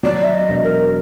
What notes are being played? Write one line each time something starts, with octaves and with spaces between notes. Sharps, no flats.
F#3 D5
E5
D#5
E1
A#4